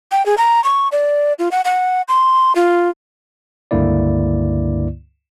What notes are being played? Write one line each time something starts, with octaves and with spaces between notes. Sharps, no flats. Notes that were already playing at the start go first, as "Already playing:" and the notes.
G5
G#4
A#5
C#6
D5
F4
F#5
F#5
C6
F4
C#2 G2 D3 A#3 E4 D5